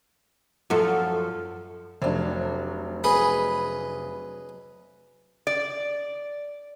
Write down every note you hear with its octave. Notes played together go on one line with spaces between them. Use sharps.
F#2 F3 A4
F1 F#3 D4
G#4 B4 D#5 B5
D5